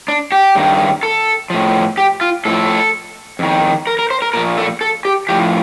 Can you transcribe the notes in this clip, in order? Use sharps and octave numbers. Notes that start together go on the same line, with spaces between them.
D4
G4
G2 D#3
A4
A2 F3
G4
F4
A2 F3 A4
F2 D#3
A#4
A#4
C5
A#4
A#2 F3 A#4
A4
A4
G4
A2 F3 G4